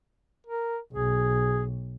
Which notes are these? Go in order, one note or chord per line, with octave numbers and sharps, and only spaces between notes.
A#4
B1 G#4